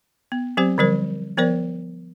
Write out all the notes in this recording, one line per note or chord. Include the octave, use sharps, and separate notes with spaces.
B3
F#3 C4 G4 C5
D3 F3 G3 A#4 C5
F3 B3 A#4 C5 D5